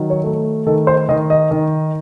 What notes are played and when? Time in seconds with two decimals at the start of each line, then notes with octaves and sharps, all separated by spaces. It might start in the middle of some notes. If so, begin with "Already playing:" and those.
Already playing: D#3 F#3
0.10 C#5
0.24 A3
0.67 D#3 A4
0.87 C5
1.09 D#3 D#5
1.30 D#5
1.51 D#3